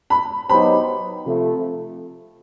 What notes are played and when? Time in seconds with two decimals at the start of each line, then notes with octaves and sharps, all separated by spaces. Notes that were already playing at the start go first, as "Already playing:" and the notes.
0.10 B5
0.49 F#3 B3 D#4 G4 C5 B5
1.26 C3 F3 A3